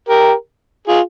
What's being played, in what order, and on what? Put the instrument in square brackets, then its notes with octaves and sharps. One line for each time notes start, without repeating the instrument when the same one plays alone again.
[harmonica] G4 A#4
F4 G#4